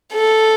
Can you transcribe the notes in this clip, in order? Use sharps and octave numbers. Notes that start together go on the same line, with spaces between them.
A4